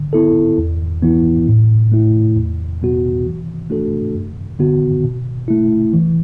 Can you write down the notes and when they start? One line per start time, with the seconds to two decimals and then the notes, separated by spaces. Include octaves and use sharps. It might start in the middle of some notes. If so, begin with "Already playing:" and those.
Already playing: D3
0.13 B3 E4 A4
0.58 E2
1.03 E3 B3 E4
1.47 A2
1.92 A3 E4
2.36 E2
2.81 B2 F#3 B3 F#4
3.26 E3
3.70 A3 D4 F#4 A4
4.14 F#2
4.59 D3 B3 F#4
5.04 B2
5.48 A3 E4
5.94 E3